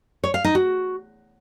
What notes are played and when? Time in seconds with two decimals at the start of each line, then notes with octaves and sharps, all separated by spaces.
0.24 C#5
0.34 F5
0.44 D#4
0.55 F#4